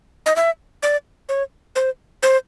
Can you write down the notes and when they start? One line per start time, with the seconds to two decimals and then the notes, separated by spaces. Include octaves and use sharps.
0.26 D#5
0.36 E5
0.83 D5
1.29 C#5
1.76 C5
2.23 C5